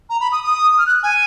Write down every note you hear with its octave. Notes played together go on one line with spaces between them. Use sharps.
A#5
B5
D#6
D#6
F6
F#6
G#5